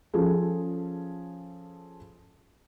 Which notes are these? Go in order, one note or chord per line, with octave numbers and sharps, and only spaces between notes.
F3 C#4 G#4 A4